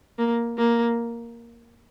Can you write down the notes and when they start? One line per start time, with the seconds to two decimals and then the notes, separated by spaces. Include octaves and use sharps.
0.18 A#3
0.58 A#3